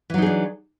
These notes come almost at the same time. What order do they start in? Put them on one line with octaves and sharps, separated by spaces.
E3 F#3 D#4 G#4 D4